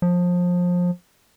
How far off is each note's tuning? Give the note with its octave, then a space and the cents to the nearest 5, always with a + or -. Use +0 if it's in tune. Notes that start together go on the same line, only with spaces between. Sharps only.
F3 +25